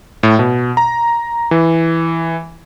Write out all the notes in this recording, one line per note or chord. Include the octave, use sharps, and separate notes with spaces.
A2
B2
A#5
E3